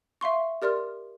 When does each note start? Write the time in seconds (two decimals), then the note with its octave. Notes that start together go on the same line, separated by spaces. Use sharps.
0.21 E5 F5 C6 C#6
0.62 G4 A#4 D5 C6 F6